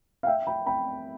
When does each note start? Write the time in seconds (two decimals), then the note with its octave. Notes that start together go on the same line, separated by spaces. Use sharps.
0.23 F5
0.27 E5 G5
0.47 G5 B5
0.66 G5 B5